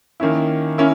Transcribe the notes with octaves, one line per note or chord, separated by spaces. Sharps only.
D#3 A#3 C#4 E4
A#3 C#4 E4